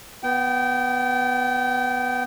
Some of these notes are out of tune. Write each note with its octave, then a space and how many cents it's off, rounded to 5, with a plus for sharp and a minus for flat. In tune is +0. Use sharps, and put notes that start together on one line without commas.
B3 +0 G5 -25